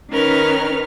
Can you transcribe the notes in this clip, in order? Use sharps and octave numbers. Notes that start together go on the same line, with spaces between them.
D#3 C#4 D#4 A#4 B4 F6